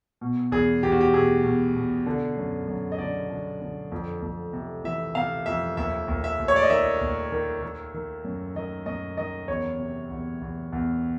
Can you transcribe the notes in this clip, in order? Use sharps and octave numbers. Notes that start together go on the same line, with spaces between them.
B2
E2 G#4
E2 G4
F#4
G4
B2 G#4
B2
B2
D3
F#2
F#2
D#5
D3 D5
D3
D3
F2
F2
C3
E3 E5
C3 F5
F2 E5
D#2 E5
D#2
E5
D#2
C#5
D5
D#5
D#3 E5
D#2
D#3
D#3
D#3
F#2
D#3 D#5
F#2 D#5
D#3 D#5
E2 C#5
C3
E2
E2
E2